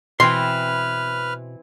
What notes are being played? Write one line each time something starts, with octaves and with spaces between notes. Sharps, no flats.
B2 E3 C4 B4 C6 F6